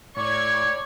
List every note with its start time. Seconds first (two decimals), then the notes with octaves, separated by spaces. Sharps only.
0.17 A2 C#5 D5 C#6 G#6